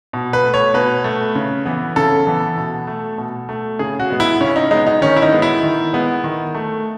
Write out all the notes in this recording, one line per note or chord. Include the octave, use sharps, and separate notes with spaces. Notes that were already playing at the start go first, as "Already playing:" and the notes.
B2
B4
A3
C#5
B2 B4
A3
C#3
E3 B3
C#3 A4
E3 B3
B2
A3
B2
A3
C#3 G#4
F#4
G#3 B3
E4
C#3 C#4
D#4
G#3 B3 D#4
D#4
D#3 C#4
E4
D#4
G#3 B3
E4
D#3
G#3 B3
D#3
A3